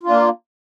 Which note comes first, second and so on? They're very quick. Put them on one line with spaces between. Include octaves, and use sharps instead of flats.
F4 D4 A#3